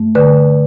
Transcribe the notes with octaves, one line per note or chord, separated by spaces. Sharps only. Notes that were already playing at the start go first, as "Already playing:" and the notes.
Already playing: G2 A3
D3 B4